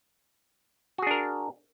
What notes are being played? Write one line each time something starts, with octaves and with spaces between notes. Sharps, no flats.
D4 F#4 G#4 A#4